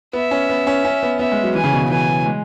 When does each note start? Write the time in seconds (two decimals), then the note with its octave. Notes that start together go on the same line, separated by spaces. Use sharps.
0.13 B3 E5
0.31 C#4
0.50 B3
0.67 C#4
0.85 C#4
1.03 B3
1.19 B3 E5
1.32 G#3
1.44 F#3
1.55 E3 G#5
1.64 C#3
1.73 B2
1.81 C#3
1.90 E3 G#5
2.08 F#3
2.26 G#3